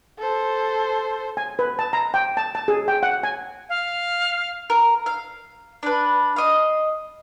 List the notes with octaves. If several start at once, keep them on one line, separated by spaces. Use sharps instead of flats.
A4 C5
G#5
B4
A5
A#5
G5
A5
A5
G#4
G5
F#5
G#5
F5
A#4
F5
D4 B4
D#5 F5